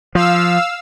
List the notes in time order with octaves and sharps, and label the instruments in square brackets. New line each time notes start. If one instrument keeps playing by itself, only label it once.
[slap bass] F3 [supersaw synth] F5 E6